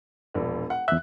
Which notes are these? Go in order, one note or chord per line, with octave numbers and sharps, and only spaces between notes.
E1 A#1
F#5
E2 E5 F#6